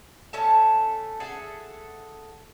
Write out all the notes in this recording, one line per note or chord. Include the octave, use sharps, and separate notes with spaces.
A3 C#4 A4 A5
G#4 A4 E5 F#5